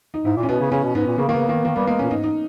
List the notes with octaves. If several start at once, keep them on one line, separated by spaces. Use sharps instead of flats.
D#4
G#2 E4
A#2
C#4
B2 B3
C#3
C#3 C#4
B2
G#2 B3
A#2
C#3 A#3
D#3 A#3
C#3 B3
D#3 A#3
D#3 A#3
G3 B3
G#3 A#3
A#2 C#4
G#2 D#4
D#4